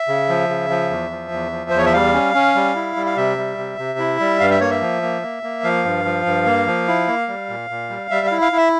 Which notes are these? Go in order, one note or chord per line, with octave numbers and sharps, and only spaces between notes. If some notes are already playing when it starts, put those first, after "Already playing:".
Already playing: E5
C#3
F3
C#3
F3
E2
F3
E2
F3
C5
E2
C#5
E5
G3 F5
C#4
C#4
G3
E4
G3
F5
C3 E5
G3
C3
C3
E4
G3
G2 F5
E5
A#3 C#5
E5
F3
A#3
A#3
A#3
F3 F5
G2
F3
G2
A#3
F3
E4
A#3
G3
A#2
A#2
G3
G3 E5
F5
E4
F5
E4
E5